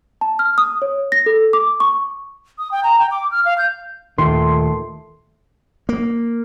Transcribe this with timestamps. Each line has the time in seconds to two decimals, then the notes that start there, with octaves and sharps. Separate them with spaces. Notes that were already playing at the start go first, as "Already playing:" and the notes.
0.21 A5
0.39 F6
0.58 D#6
0.82 C#5
1.12 A#6
1.26 A4
1.53 D6
1.80 C#6
2.58 D#6
2.71 G5
2.83 A#5
2.99 G5
3.11 D6
3.31 F6
3.45 F5
3.58 G6
4.18 D#2 A#2 D#3 A3 C6
5.89 A#3